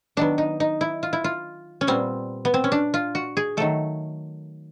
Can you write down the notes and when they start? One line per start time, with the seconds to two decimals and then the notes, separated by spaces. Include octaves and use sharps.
0.17 D#3 F#3 B3 D4
0.38 D#4
0.60 D#4
0.81 E4
1.03 F4
1.13 E4
1.24 F4
1.81 C#4
1.87 A#2 G3 B3 C4
2.45 B3
2.54 C4
2.64 C#4
2.72 D4
2.94 F4
3.15 F#4
3.37 G#4
3.57 D#3 F#3 A3 A4